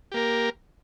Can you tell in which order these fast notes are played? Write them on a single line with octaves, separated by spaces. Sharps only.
G4 A#3 A#4